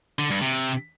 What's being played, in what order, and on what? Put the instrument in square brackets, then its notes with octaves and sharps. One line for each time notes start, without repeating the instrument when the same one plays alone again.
[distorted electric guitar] D3
G2
C3